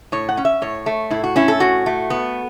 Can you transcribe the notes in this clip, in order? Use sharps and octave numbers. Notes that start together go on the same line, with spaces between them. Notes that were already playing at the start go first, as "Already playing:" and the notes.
A2 C#5
F#5
C#4
E5
A2 C#5
A3
A2 E4
F#4
C#4 E4
A4
A2 F#4
A3
B3